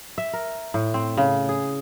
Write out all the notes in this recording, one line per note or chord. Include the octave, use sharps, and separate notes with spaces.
E5
A#4
A2
C4
C#3
G#4